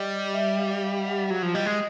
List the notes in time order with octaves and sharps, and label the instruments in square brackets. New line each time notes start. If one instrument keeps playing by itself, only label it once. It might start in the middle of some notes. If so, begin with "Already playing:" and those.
Already playing: [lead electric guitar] G3 [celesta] D#5
[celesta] E5
F5
F5
F#5
[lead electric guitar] F#3
F3
[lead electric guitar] G3 [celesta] D#5
[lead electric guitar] G#3